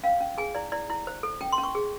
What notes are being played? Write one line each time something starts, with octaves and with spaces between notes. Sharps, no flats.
C#4 F5
C#4
G#4 G#5
E4 D5
E4 D5
E4
C5
A4
C#4 G5
C6
C#4
C#6
G#4